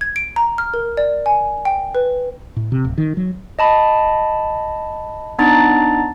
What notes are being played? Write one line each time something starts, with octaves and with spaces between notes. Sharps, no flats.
G#6
D7
A#5
F6
A#4
D5
G#5
G5
B4
A2
C3
D1
D#3
F#3
D#5 A5 B5
B3 D4 D#4 A#5 A6